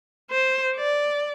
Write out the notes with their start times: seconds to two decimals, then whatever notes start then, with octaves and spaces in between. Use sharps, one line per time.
0.31 C5
0.75 D5